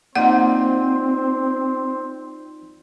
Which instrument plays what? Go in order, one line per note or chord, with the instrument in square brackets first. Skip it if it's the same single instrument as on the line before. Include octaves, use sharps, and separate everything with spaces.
[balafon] A#3 F#5 [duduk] C4 [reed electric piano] D#4 F4 D5 [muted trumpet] C5